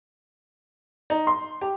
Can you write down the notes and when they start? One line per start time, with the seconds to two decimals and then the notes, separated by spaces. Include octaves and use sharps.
1.10 D#4
1.27 C6
1.61 G4